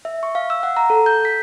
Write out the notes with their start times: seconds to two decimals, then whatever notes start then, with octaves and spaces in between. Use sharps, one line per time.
0.05 E5
0.23 C#6
0.35 F5
0.50 E6
0.63 F#5
0.77 A#5
0.90 A4
1.06 G6
1.25 B6